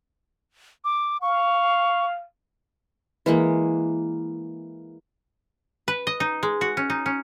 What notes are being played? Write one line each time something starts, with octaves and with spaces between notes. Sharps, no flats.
D6
F5 C#6
E3 G#3 A#3
B4
D#5
D#4
G#3
F#4
C#4
D#4
C#4